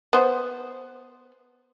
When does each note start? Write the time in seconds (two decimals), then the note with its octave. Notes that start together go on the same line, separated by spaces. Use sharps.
0.13 B3 C5